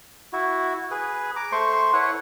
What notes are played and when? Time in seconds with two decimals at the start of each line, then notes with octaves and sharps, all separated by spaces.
0.33 E4 F#4
0.91 G#4 B4
1.36 A#5 D6
1.52 A3 C5 C6 C#6
1.93 E4 B4 C#5 F#5